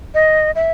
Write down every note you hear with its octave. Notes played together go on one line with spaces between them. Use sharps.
D#5
E5